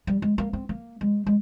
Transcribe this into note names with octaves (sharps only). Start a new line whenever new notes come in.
G3
G#3
A#3
C4
A#3
G#3
G#3